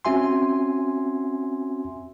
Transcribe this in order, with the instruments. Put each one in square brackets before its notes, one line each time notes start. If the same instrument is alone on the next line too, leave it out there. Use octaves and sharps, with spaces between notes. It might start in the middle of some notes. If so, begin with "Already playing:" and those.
[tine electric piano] C4 C#4 F#4 E5 G#5 C6